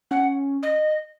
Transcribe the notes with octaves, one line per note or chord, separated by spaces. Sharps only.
C#4 F#5
D#5